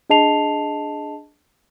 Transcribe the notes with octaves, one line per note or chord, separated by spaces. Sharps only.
D4 G#4 D#5 A5 C7 F7